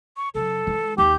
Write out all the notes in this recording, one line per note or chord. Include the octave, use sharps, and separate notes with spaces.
C#6
F#2 C#3 A4
E3 G#3
D#2 G4 G6